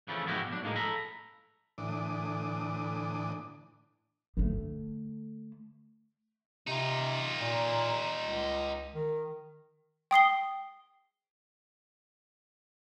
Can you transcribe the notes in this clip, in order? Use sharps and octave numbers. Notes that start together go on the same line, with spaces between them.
C#3 E3 F3 A3
G#2 B2 F3 E4 F#4 G4
B1 D4
A2 F3 G#3 A#3 D#4
A4 A#5 B5
A2 D3 E3 D4 D6 D#6
D3 A3
C3 D#4 F4
A#2
C#2
D#3
G5 D#6 C7 G7